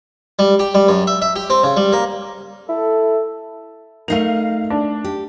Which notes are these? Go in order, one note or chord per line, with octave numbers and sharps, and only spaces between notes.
G3
G4
G3
F#2
E5
E5
G4
C4
C#3
G3
A#3
E4 A4
A3 D#4 A#4 F5 C7 F7
D4
G4